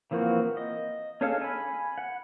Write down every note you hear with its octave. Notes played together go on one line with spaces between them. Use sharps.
E3 F3 A#3 C4 F#4
D#5
C#4 D4 G#4 A4 F5
G#5 B5
F#5